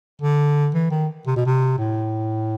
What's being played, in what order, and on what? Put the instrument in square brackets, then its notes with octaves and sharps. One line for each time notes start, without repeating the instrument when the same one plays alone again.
[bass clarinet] D3
E3
D#3
C3
B2
C3
A2